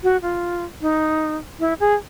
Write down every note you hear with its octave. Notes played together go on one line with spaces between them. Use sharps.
F#4
F4
D#4
E4
G#4